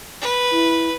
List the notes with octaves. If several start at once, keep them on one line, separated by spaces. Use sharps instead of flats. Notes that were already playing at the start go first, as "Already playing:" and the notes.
B4
E4